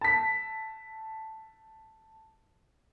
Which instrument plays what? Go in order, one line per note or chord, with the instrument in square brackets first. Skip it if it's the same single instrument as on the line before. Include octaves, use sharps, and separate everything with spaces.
[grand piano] A5 B6